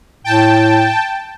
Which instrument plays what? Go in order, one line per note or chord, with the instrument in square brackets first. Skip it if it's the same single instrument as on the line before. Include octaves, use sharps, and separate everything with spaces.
[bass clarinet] A2 [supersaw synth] G5 A5